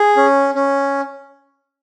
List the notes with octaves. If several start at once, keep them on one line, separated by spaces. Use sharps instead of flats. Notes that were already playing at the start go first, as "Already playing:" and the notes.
Already playing: G#4
C#4
C#4